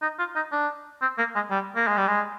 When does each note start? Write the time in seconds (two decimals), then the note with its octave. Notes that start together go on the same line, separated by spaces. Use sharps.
0.02 D#4
0.19 F4
0.36 D#4
0.52 D4
1.02 C4
1.18 A#3
1.35 G#3
1.51 G3
1.76 A#3
1.87 G#3
1.98 G3
2.08 G#3